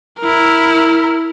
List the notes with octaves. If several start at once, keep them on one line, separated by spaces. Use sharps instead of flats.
E4 A#4